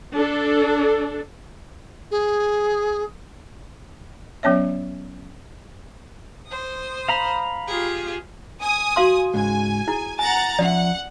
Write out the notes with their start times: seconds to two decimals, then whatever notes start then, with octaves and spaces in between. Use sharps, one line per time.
0.15 D4 A4
2.11 G#4
4.43 F#3 B3 C#4 C#5 E5
6.48 C5 D#6
7.08 F5 A#5 B5
7.67 F4 G4 G#4
8.60 G#5 D#6
8.96 F#4 F5 C6
9.34 G#2 C#3 G#3 G#5
9.88 E4 G#4
10.19 F#5 G#5 A#5 A6
10.59 F3 C#4 D5 E5 F#5